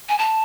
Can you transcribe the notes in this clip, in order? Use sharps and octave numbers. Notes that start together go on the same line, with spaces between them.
G#5
A5